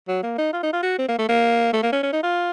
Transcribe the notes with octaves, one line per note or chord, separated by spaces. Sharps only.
F#3
A#3
D#4
F4
D#4
F4
F#4
C4
A#3
A3
A#3
A3
A#3
C#4
C#4
D#4
F4